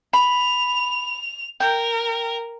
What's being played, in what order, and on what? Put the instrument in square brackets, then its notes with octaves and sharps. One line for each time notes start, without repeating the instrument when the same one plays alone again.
[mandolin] B5 [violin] F7
[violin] A#4 [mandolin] G5